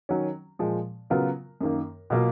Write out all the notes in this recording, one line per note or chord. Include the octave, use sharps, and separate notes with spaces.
D#3 F#3 C#4
A#2 F3 G#3
C#3 F#3 B3 F4 A#4
F#2 D#3 A#3
B2 F#3 A#3 F4